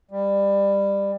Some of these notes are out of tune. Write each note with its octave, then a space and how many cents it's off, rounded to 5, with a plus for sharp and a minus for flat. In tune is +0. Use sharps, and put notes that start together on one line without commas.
G3 +20